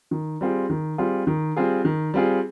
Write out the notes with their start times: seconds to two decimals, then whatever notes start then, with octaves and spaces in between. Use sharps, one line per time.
0.11 D#3
0.41 G3 C4 F4 G#4
0.70 D#3
0.98 G3 C4 F4 G#4
1.27 D#3
1.56 G3 C4 F4 G#4
1.85 D#3
2.14 G3 C4 F4 G#4